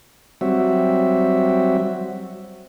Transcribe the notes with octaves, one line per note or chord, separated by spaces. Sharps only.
F#3 G3 C4 F#4 E5